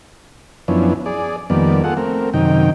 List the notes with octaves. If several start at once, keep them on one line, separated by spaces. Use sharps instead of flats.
F#2 F3 B3 C#4 D4 E4
G#4 D5
F2 D#3 G3 A#3 B3 D5
F4 G#4 A4 F#5
A3 C4 A#4
F#2 C3 D#3 D#4 G5